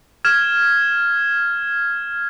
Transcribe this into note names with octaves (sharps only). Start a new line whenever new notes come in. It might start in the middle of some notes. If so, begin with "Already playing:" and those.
F6 G#6 E7